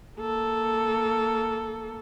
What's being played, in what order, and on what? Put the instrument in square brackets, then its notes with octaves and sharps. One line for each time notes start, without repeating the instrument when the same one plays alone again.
[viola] A#3 A4